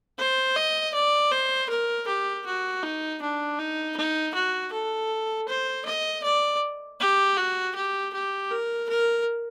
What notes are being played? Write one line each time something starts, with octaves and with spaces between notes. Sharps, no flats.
C5
D#5
D5
C5
A#4
G4
F#4
D#4
D4
D#4
D#4
F#4
A4
C5
D#5
D5
G4
F#4
G4
G4
A#4
A#4